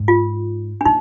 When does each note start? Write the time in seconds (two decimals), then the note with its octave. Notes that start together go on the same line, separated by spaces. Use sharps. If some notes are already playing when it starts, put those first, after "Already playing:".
Already playing: G#2
0.08 F4
0.81 D4
0.85 A#2 D#4